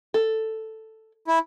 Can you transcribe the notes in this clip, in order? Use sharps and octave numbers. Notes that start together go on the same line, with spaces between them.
A4
E4